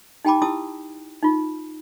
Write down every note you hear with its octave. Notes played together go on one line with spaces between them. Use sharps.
D#4 G4 G5 A5 B5 D6
E4 G4 A5 D#6 E6
D#4 F4